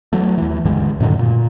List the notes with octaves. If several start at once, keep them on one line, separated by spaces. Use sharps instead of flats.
E3 F#3 A3
D#2 E3
C#2 G2 D3 G#3
F#2 A2 D3 D#3
A#2